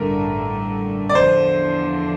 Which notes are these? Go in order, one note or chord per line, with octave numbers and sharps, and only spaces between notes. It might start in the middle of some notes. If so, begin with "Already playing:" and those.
Already playing: A1 G2 D3 A3 A#4
D5
E2 D3 F3 C5